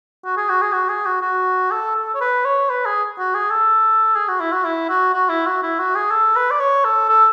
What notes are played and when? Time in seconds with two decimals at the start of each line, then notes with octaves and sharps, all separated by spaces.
0.25 F#4
0.37 G#4
0.49 F#4
0.62 G#4
0.73 F#4
0.89 G#4
1.06 F#4
1.22 F#4
1.71 A4
1.96 A4
2.14 C#5
2.21 B4
2.45 C#5
2.70 B4
2.86 G#4
3.18 F#4
3.34 G#4
3.50 A4
4.16 G#4
4.29 F#4
4.40 E4
4.52 F#4
4.65 E4
4.89 F#4
5.14 F#4
5.29 E4
5.46 F#4
5.62 E4
5.79 F#4
5.95 G#4
6.11 A4
6.36 B4
6.51 D5
6.60 C#5
6.85 A4
7.09 A4